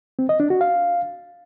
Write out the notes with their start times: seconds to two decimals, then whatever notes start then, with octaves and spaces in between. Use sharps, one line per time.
0.19 C4
0.29 D#5
0.40 D4
0.50 F#4
0.61 F5